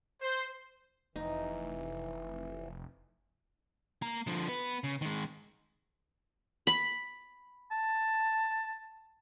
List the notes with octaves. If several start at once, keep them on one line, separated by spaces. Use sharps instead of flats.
C5
F1 E3 D#4
A#3 A#5
D3 F3
B3 B4
C#3
D#3 G#3
B5
A5